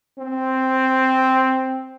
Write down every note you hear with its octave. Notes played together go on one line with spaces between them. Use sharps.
C4